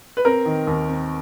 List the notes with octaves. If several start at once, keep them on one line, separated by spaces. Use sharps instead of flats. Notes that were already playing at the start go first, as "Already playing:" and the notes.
B4
C4 A#4
D#3
D#2
C4